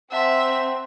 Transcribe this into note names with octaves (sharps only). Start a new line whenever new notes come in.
C4 E5 F#5 A5 C6